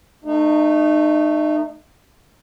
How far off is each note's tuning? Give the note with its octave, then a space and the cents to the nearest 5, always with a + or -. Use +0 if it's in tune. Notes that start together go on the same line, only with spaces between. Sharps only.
A3 +5 D#4 -30